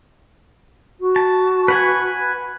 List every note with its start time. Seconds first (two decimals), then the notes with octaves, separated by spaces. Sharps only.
1.01 F#4
1.16 A5
1.68 B4 F#5 G#5